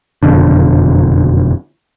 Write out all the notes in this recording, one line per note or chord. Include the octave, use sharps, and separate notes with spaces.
F#1 F2 B2 D3